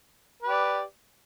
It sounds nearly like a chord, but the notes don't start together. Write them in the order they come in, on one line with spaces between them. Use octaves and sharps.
B4 G4 D5